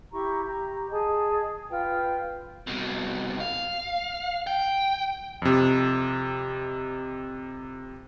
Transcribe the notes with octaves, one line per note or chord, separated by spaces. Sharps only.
E4 G4 A#5 C#6
G4 A#5
G#4 D#5 G#5 A5
F4 B4 G5
C2 B2
F5
G5
F2 C3